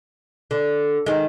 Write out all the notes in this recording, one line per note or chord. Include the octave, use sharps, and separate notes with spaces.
D3
D#3 G#3